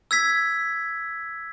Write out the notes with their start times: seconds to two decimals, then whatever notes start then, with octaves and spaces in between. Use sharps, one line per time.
0.11 E6 G#6 B6